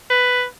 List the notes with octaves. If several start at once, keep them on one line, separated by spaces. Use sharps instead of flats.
B4